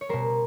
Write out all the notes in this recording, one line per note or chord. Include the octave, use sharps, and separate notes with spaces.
C#5
B2 G3 A#4 C5